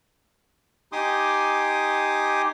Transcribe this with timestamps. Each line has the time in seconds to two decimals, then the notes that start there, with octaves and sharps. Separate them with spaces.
0.92 D#4 G4 G#5 C6 D6 D#6